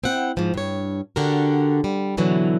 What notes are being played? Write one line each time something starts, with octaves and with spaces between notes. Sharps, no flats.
C4 E4 F#5 G5
G#2 F3
G2 C#5
D3 D4 F#4 G4 A#4
G3
B2 D3 E3 F#3